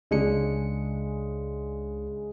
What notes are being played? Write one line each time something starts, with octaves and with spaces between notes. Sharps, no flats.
C#2 C#3 G#3 D4 C#7